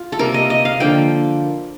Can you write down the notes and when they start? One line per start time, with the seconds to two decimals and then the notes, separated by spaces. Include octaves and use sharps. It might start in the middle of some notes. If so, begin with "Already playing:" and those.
Already playing: F4
0.12 A4
0.19 C3 G3 A#3 A#4
0.34 D#5
0.50 D#5
0.65 F5
0.80 D3 F3 A#3 G5